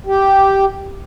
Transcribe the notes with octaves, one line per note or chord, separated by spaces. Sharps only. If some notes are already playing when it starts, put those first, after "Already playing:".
G4